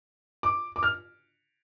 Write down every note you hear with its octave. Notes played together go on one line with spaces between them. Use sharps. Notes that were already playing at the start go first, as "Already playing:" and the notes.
D6
D6
F6